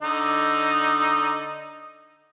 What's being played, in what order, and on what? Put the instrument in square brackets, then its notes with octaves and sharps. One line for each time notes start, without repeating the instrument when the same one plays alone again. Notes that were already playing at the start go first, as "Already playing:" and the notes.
[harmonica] D3 D#4